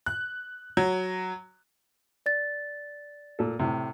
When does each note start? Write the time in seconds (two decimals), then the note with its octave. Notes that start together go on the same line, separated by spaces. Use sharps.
0.06 F#6
0.77 F#3
2.26 D5 A6
3.39 A#2 A4
3.59 A2 C3